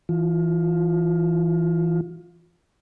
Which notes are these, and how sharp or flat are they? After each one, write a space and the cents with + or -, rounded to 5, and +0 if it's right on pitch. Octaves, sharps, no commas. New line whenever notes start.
E3 +0 F4 +20